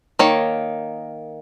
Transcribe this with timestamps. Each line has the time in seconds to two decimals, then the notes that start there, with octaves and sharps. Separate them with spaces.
0.19 D#3 A#3 C#5